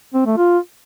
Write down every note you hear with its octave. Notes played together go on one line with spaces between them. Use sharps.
C4
A3
F4